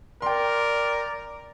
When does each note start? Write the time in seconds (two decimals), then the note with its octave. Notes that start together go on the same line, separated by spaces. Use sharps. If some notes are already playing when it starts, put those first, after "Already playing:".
0.22 A#4 D5 G5 C6